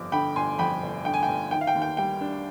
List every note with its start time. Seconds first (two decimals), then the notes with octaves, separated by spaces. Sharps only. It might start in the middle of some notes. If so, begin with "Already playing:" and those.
Already playing: G1 F2 D6
0.12 D3 G5 B5
0.36 G1 G#5 C6
0.59 F2 G5 B5
0.83 G1
1.05 D3 G5
1.14 G#5
1.23 G5
1.28 G1
1.51 D#3 G5
1.61 F5
1.67 G5
1.75 D#2
1.82 G5
1.97 G3 G5
2.21 D4